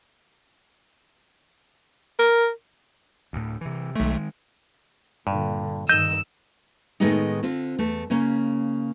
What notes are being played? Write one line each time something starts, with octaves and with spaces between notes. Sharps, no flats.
A#4
D2 A2
C3 E3
B1 D#3 G#3 A3
G2 A#2 D3
G2 D#3 D#5 E6 G6
A2 D#3 G#3 A3 B3 D#4
D3 C4 F4
E2 A3
C#3 A#3 C#4